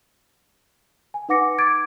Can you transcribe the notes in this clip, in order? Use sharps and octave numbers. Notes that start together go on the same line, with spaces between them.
G#5
D#4 B4 F#5 D6 A#6 C#7
D6 G#6 A6 D7